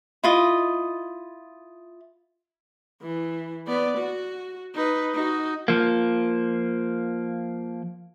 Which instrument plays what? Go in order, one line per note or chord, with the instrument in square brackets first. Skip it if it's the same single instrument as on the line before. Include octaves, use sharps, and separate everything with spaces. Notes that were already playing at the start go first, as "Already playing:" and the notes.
[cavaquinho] E4 F4 D#5
[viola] E3
B3 D5
F#4
D#4 B4
D#4 F#4
[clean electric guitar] F3 A#3